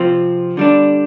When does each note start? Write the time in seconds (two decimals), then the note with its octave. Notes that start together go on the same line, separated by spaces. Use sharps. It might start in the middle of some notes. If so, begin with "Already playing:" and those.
Already playing: C3 F3 C4 F4
0.57 D3 G3 D4